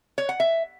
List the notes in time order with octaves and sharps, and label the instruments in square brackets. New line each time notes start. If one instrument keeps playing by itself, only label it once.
[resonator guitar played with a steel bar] C#5
F#5
E5